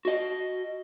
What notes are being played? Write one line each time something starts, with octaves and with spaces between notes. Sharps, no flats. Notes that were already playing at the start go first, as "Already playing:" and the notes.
F#4 D#5